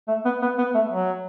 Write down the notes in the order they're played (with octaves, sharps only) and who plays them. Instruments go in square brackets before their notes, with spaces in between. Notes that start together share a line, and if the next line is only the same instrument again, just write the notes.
[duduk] A3
B3
B3
B3
A3
F#3